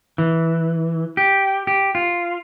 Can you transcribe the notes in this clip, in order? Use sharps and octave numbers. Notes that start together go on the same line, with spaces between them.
E3
G4
G4
F4